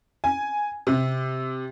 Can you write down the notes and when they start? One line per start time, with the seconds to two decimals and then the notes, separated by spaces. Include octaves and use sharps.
0.24 G#5
0.87 C3